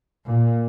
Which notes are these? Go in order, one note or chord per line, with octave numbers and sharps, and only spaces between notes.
A#2